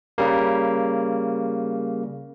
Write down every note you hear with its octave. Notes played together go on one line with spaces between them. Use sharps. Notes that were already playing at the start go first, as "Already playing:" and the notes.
C#3 G3 A#3